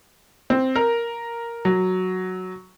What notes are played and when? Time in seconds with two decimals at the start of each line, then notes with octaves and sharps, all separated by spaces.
0.50 C4
0.76 A#4
1.65 F#3